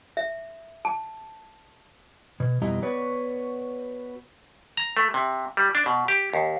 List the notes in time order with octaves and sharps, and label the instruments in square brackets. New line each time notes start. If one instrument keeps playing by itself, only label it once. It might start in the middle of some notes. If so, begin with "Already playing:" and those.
[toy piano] E5
A5
[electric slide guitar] B2
F2 B2 G3 E4 D#5 A#5
B3 F#4 B4 C#5 D5
[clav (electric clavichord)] A#5
A3
C3
G3
D4
B2
G4
D#2